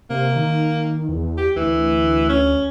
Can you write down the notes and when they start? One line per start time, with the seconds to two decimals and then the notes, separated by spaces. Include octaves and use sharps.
0.10 C3 A#3
0.36 D#3
1.09 E2
1.37 G4
1.56 D2 E3
2.29 C#4